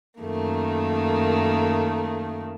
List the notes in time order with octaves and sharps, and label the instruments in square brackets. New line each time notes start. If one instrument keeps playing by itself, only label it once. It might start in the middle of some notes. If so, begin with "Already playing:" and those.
[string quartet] F#2 D#3 A3 A#3